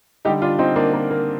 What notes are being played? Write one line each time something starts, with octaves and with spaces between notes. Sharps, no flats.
D3 G3 D#4 G4
D4 F4
C4 D#4
A#3 D4
A#3
A#3